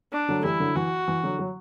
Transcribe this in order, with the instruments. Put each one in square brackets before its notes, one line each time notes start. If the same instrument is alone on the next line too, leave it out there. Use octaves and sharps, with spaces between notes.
[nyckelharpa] D4
[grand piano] D3 F#3
A3
[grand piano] E3 G3 [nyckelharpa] E4
[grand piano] D3 F#3
[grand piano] E3 [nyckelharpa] F#4
[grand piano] E3
D3 F#3
F#3